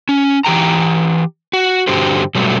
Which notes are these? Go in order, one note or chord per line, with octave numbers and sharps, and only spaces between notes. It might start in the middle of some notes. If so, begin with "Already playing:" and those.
C#4
E3 G4 G5 A#5
F#4
G2 D3 F#4 G4 C5
B2 F#3 G3 A3